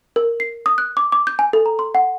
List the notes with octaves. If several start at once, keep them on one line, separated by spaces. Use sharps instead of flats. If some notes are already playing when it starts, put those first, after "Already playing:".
A#4
C7
D#6
F#6
D6
D6
G6
G#5
A4
A#5
C6
F#5